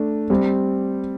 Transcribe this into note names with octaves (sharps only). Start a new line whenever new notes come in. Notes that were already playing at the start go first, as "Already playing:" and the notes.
Already playing: A3 D4
G3 C4